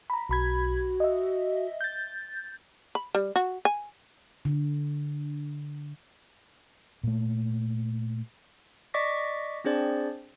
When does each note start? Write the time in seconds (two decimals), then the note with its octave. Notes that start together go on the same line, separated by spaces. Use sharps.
0.10 A#5 B5
0.29 B1 F#4 B5 G#6
1.00 D#5 E5
1.81 G6 A6
2.95 B5
3.15 G3
3.36 F#4
3.65 G#5
4.45 D3
7.04 A#2 A3
8.94 D5 D#5 C#6 D6 A#6 B6
9.64 C4 D4 G#4 C5 D5